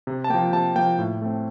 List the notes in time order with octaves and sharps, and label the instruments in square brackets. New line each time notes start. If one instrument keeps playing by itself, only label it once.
[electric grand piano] C3
A5
F3 A#3 G5
C3 A5
F3 A#3 G5
A2
A3 C4